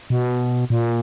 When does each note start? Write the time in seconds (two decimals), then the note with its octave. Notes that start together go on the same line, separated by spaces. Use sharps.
0.10 B2
0.70 A#2